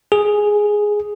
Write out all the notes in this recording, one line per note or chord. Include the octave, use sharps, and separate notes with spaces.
G#4